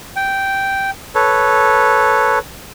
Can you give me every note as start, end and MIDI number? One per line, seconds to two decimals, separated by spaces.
0.16 0.90 79
1.15 2.39 69
1.15 2.39 71
1.15 2.39 73